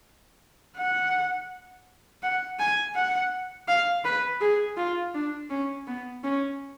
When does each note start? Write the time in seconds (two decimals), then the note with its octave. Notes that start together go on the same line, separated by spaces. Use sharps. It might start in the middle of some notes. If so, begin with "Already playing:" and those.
0.77 F#5
2.23 F#5
2.60 G#5
2.96 F#5
3.68 F5
4.05 B4
4.41 G#4
4.78 F4
5.14 D4
5.50 C#4
5.88 B3
6.24 C#4